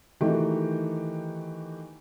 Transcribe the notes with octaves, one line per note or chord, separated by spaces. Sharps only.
D#3 E3 A3 D#4 F#4 G4